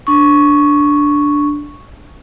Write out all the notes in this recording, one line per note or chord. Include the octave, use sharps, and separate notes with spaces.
D4 C#6